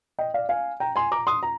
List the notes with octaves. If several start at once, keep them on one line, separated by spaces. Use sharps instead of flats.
D#5 G5
D5 F5
F5 G#5
G5 A#5
G#5 C6
A#5 D6
C6 D#6
A#5